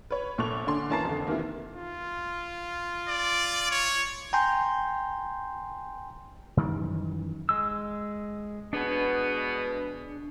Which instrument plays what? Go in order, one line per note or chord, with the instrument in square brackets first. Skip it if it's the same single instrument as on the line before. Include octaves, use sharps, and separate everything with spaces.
[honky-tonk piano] B4 C#5
A#1 A#2 A4 C#6 F#6 F7
D3 C#4 D4 C6
E3 A#3 C#4 A5 A#5 C7
F2 D3
C3 D#3 E3 A#3
[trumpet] F4
[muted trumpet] D5
C#5
[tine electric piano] G5 G#5 A#5 C6 G6
[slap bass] F#2 D#3 E3 G3
[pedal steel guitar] G#3 E6
[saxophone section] B2 G#3 B3 [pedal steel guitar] D4 G#4 C#5